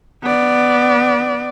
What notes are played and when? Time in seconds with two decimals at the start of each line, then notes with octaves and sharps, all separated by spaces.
0.23 B3 D5